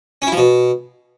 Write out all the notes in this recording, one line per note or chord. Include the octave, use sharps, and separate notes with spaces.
C#4
E4
F3
B2